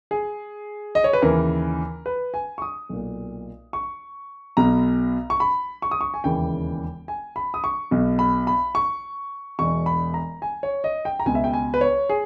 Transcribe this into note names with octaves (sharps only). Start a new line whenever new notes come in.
G#4
D#5
C#5
B4
D#2 C#3 E3 A#4
B4
G#5
C#6
D#6
B1 A#2
C#6
B1 B2 A#5
C#6
B5
C#6
D#6
C#6
G#5
E1 D#2 C#3 E3 G5
G#5
B5
D#6
C#6
B1 B2
B5
B5
C#6
E1 E2 B2 C#6
B5
A#5
G#5
C#5
D#5
G5
A#5
C#2 B2 G#5
E5
G5
G#5
B4
C#5
G#4